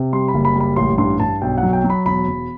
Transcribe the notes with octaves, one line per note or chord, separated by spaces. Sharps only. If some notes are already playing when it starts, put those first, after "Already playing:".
Already playing: C3
G3 C6
B5
F#1
B5
G3 B5
A1 C6
G2 C6
G2 A5
B1 G5
F#5
F#3
G5
F#3
B5
E1 B5
E1